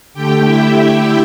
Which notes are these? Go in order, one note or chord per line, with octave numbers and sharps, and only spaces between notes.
D3 A3 G4 G5
E4 E5